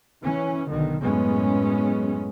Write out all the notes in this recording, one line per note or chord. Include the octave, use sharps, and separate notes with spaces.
E3 C#4
B1 D3 D#3
F#2 A2 G#3 B3 C#4